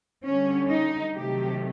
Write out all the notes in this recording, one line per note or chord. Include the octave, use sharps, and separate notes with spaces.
D3 G3 C#4
D#4
C3 D#3 F#3 A3 G4